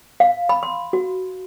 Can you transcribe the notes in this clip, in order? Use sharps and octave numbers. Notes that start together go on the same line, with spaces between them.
F5
B5
C6
F#4